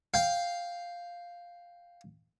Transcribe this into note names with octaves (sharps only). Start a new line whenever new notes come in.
F5 G5